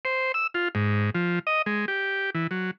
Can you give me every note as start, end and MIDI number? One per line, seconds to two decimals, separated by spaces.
0.05 0.32 72
0.34 0.47 88
0.54 0.68 65
0.75 1.10 44
1.15 1.39 53
1.47 1.62 75
1.66 1.86 56
1.88 2.30 67
2.35 2.47 52
2.51 2.71 54